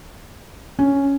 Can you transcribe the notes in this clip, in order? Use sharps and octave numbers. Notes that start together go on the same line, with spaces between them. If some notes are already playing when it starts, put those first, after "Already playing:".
C#4